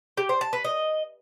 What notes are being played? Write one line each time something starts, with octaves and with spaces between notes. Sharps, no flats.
G4
C5
A5
B4
D#5